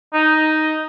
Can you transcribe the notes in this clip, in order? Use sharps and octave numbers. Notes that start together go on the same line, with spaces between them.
D#4